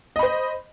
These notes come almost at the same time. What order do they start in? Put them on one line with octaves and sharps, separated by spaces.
D#5 B5 C5